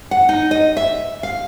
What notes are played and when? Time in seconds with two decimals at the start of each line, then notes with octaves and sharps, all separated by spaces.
0.11 F#5
0.29 D#4
0.51 D#5
0.77 E5
1.23 F5